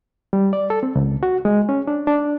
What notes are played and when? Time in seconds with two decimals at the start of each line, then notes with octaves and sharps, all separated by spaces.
0.33 G3
0.53 D5
0.70 A4
0.83 C4
0.96 C#2
1.23 F#4
1.45 G#3
1.69 C#4
1.88 D4
2.07 D4